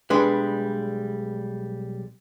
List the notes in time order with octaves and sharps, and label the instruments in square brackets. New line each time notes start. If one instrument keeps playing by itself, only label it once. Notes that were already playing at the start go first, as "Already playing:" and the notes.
[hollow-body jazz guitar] B1 G3 G#3 D4 B4